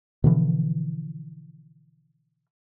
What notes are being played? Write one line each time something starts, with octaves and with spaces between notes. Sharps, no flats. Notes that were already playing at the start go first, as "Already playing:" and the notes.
B2 D3 E3 F3